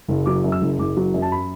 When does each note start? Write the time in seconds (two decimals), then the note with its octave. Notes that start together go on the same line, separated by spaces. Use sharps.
0.08 F#1
0.26 F#3 D6
0.44 F#2
0.52 E6
0.62 F#1
0.78 F#1 D6
0.97 F#3
1.14 F#2
1.22 A5
1.32 B5